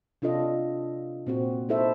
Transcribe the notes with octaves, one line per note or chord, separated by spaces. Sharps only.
C3 D4 F4 A4 D#5
A#2 C4 F#4
D#4 E4 A4 C5 E5